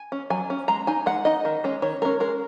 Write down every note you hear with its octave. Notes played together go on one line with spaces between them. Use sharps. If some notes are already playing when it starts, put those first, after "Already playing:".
Already playing: G#5
C#4
F#3 G#5
C#4
G#3 A#5
D#4 G#5
G#3 F#5
D#4 D#5
D#3
G#3 C#4
D#3 C#5
G#3 C#4 A#4
G#3 A#4